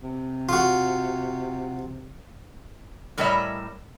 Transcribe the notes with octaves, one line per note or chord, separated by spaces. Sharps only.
C3
F4 F#4
A2 G3 A#4 C#5 D#5 E5